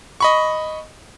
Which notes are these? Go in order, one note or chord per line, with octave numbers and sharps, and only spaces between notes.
D#5 B5 C#6